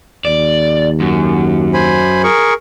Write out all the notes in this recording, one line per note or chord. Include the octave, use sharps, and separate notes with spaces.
D#2 D5
F#2
C5 G#5 B5
G#4 A#4 C#6